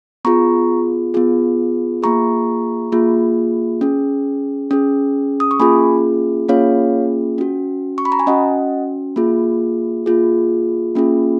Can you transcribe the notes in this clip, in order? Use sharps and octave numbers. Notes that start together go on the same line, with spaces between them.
B3 F4 G#4 A#5 C#6
B3 F4 G#4
A#3 F4 G#4 A#5 C#6
A#3 F4 G#4
C#4 G#4
C#4 G#4
D#6
C#6
A#3 C#4 F4 G#4 G#5 B5
A#3 C#4 F4 G#4 C#5 F5
C#4 F#4
C#6
B5
A#5
G#5
C#4 F#4 D#5 F#5
A#3 F4 G#4
A#3 F4 G#4
A#3 C#4 F4 G#4